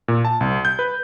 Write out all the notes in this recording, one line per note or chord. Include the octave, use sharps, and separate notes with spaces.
A#2
A5
C2
G6
B4